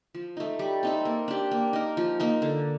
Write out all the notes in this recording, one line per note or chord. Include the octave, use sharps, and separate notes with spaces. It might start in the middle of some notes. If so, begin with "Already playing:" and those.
F3
A3 D#4
G3
C4 D#4 A4
A#3
D4 G4
A#3
D#4 A#4
F3
A#3 D#4 A#4
D3